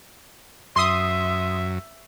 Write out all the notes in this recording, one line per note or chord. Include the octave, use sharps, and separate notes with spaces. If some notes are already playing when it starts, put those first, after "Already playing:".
F#2 E5 C6 D#6